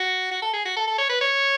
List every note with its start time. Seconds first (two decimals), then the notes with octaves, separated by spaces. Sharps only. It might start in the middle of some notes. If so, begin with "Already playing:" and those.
Already playing: F#4
0.31 F#4
0.42 A4
0.53 G#4
0.65 F#4
0.77 A4
0.87 A4
0.98 C#5
1.10 B4
1.21 C#5